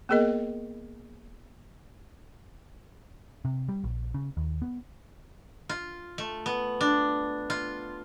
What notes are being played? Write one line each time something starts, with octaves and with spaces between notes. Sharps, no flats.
A#3 B3 G#4 A#4 D#5
C3
G3
A#1
C#3
D#2
B3
F4
A3
B3
D4
F4